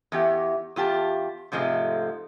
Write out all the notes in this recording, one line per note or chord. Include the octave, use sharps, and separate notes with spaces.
E2 E3 G4
E2 F4 G4 A5
G#2 C3 F3 G#3 A3